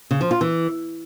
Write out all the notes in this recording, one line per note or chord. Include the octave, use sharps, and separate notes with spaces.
C#3
F3
F4
E3